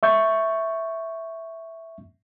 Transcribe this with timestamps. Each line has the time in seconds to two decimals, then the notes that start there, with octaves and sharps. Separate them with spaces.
0.03 E5 C#6 G6